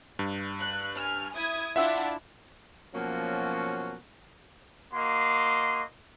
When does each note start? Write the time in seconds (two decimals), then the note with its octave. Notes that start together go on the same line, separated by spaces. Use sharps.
0.19 G2
0.59 F#6
0.97 G#5 F6
1.35 E4 D#6 G#6
1.76 D4 E4 F4 E5 F#5 E6
2.94 B2 F3 F#3 A#3 C#4 F#4
4.93 A#3 F#4 D#5 C6